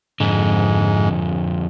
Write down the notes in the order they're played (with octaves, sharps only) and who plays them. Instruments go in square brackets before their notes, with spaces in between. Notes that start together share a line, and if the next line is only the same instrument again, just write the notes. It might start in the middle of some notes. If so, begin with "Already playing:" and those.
[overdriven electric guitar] F2 D3 [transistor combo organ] G#2